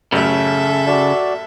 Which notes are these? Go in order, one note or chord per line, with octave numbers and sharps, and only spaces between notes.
A1 F#2 C#3 A4 E5
F#4 D5